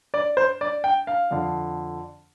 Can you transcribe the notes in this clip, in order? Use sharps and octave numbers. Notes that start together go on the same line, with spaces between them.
D5
C5
D5
G5
F5
F2 D3